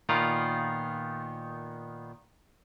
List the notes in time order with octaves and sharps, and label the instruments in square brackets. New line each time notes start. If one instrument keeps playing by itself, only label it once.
[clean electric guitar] A#2 D#3 B3 F4